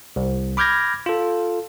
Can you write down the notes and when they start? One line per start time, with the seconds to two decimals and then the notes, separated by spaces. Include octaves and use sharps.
0.16 C2
0.57 B5 D6 F6 G6 G#6 A#6
1.06 F4 A4